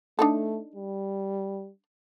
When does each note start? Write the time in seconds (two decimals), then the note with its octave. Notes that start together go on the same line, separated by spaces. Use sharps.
0.19 A3 D4 D#4 A4
0.76 G3